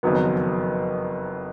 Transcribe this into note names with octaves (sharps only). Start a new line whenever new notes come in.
F#1 F2 D#3 F#3 B3